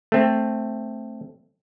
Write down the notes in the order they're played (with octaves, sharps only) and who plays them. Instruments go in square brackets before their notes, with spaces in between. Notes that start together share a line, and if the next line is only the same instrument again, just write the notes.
[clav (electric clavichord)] A3 C4